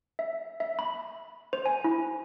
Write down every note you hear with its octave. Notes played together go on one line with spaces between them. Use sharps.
E5
E5
B5
C5
G#5
E4